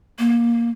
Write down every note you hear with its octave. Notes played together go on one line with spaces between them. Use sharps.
A#3